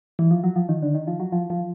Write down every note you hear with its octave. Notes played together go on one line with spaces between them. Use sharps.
E3
F3
F#3
F3
D#3
D3
D#3
F3
F#3
F3
F3